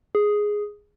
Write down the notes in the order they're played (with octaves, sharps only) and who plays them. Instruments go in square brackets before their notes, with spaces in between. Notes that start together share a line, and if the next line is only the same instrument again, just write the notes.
[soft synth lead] G#4